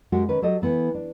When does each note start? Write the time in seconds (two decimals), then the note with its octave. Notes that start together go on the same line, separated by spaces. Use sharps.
0.12 F#2 G#3 F#4 G4
0.29 D#3 C#4 B4
0.42 F#3 G4 A4 D#5
0.62 E3 B3 A4
0.94 D4